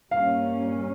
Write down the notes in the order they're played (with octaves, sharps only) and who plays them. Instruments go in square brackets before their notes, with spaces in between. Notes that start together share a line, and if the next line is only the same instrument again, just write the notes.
[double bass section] G2 G3 A#3 C#4 [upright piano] F5